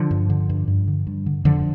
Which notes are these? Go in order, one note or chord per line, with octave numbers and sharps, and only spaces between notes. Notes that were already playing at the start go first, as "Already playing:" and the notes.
Already playing: D3 F3
G2
D3
G2
G2
D3
G2
D3
F2 D3 F3